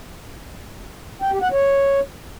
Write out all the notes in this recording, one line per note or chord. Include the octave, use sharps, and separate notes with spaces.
G5
G4
F#5
C#5